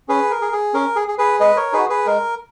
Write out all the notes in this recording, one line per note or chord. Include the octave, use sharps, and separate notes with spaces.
C#4 G#4 B4
A#4
G#4
G#4
C#4 A#4
G#4
G#4
G#4 B4
G#3 B4 D#5
A#4 C#5
D#4 F#4 G#4 B4
G#4 B4
G#3 A#4